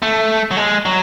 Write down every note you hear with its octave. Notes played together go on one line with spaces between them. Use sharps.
A3
F#3
G#3
F#3